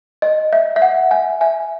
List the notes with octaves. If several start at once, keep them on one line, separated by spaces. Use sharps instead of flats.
D#5
E5
E5
F#5
E5 G#5
E5 G#5